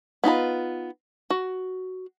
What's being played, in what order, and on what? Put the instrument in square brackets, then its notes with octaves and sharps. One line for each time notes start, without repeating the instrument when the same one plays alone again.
[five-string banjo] B3 D#4 F4 B5
F#4